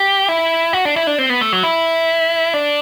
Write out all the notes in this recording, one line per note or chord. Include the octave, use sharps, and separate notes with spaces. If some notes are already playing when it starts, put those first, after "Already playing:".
Already playing: G4
E4
F#4
D4
E4
D4
C4
B3
A3
F#3
E4
D4